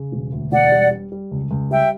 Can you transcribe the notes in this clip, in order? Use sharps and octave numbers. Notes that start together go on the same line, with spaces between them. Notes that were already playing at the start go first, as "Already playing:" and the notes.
Already playing: C#3
E1
D2
E1 D5 F#5
G3
G3
G3
C#2
C#2
G3 E5 G5